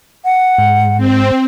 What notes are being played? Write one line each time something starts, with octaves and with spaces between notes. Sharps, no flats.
F#5
G#2
C4